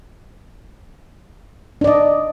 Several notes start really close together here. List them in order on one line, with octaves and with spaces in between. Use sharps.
D4 D5 D#5